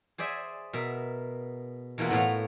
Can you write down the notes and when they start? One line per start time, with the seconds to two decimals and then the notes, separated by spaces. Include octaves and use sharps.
0.18 G#4 C5 D5 E5 G#5
0.73 B2 A#4 E5
1.98 E2 B2 E3 A#3 F4 F#5
2.10 A2 B3 F#4 F5